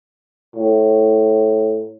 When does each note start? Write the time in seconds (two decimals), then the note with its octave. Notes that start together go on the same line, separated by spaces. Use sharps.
0.56 A2